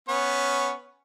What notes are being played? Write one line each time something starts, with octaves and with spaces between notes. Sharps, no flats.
B3 C#4 C#5